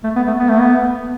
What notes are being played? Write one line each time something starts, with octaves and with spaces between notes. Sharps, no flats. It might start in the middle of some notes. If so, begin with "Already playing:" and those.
A3
B3
A3
B3
A3
B3